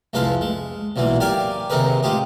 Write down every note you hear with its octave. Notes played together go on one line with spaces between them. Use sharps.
C2 F2 G#3 B4 F5 A5
G#3
B1 A#2 E3 A#3
G4 A#4 D5 F5 G5 G#5
D#2 C3 D#4 G#4 A#4 B4
G#3 F4 G4 G#4